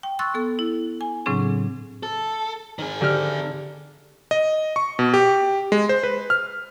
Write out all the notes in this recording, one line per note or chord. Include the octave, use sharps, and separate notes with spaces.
G5
G5 C6 C#6 E6 F#6 A6
B3 A4
E4
G#5
A2 C#3 F#3 C4 D4 G#4
A4
D#3 G#4
D3 G4 F6
D#5
C#6
B2
G4
G#3
C5
B4
F6